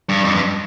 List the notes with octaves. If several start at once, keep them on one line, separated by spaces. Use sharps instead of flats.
G2
F2
G2